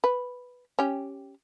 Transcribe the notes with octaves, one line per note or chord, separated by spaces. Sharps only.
B4
C#4 G4